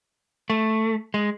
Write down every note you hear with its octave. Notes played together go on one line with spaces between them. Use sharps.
A3
G#3